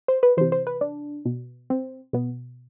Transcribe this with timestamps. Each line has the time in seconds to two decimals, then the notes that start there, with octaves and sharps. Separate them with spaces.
0.08 C5
0.23 B4
0.37 C3 E3 C5
0.52 C5
0.67 B4
0.81 D4
1.25 B2
1.70 C4
2.13 B2 B3